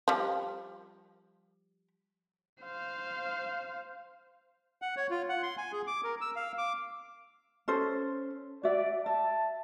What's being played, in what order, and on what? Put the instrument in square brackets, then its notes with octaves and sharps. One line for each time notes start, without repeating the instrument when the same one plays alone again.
[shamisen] F3 G3
[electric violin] C5 F5
[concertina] F#5
C#5
F4
F#5
C6
G#5
G#4
D6
A#4
E6
F5
D6
[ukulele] C#4 A4 C5
[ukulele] F#4 E5 [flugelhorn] D5
[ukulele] E5 [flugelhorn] A5